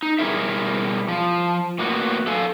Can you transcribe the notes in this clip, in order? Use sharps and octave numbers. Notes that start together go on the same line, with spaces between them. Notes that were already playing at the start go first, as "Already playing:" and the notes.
D#4
B2 G3 E4 G#4 A#4 E5
F3
A2 A#3 B3 F#4
A4 F5 G#5